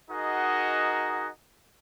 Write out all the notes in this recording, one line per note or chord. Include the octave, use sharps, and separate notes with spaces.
D#4 F#4 G#4 A#4 D#5 F#5